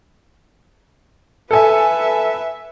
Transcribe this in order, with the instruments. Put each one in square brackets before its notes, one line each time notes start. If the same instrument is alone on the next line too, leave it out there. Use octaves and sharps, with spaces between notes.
[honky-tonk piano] A4 G#5 [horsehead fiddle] B4 E5